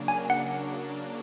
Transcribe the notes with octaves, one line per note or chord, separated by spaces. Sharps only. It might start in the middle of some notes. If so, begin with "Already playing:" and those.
Already playing: C#3 F#3 A#3 D4
G#5
F#5